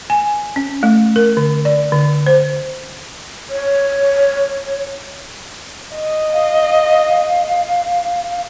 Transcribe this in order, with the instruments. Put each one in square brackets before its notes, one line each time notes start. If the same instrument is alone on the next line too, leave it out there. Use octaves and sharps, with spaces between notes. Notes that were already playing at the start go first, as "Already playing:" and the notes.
[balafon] G#5
C#4
A3
A#4
D3
D5
D3
C5
[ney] C#5
[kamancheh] D#5
[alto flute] F5